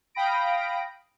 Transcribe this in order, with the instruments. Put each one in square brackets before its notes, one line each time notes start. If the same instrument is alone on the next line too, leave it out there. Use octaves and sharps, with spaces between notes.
[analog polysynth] F5 G5 B5 D#6 A#6 D7